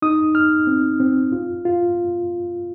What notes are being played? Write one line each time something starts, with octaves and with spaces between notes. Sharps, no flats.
D#4 D#6
D#4 F6
C4
C4
F4
F4